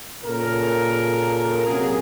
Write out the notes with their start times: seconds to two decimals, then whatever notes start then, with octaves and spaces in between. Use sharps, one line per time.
0.24 A#2 C#3 A#3 A4 A#4
1.66 C3 F#3 A#3 C#4 G#4